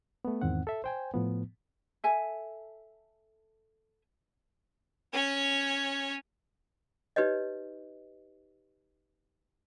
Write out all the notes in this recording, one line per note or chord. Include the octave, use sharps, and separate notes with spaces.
A3 B3
E2 G#2 D#3 C4 F#5
A4 E5
C5 G5 G#5
A2 F3 B3
A4 E5 G#5
C#4 C#5
D#4 G4 B4 C#5 D#5